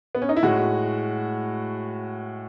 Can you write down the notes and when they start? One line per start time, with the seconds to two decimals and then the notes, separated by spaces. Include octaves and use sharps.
0.15 B3
0.22 C#4
0.29 D#4
0.36 E4
0.43 A2 G#3 F#4